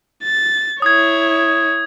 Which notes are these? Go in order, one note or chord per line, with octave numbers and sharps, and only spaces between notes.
A6
E4 C#5 D#6 G#6